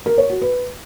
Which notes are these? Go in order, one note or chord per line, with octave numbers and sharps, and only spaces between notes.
A#4
C#5
F#4
B4